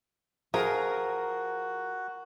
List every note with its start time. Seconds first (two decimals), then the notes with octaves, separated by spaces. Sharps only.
0.54 F3 F#4 G#4 A#4